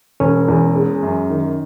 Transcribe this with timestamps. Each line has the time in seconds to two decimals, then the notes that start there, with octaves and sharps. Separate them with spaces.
0.20 E1 C#4
0.48 E2
0.76 G#3
1.03 F#2
1.30 D#3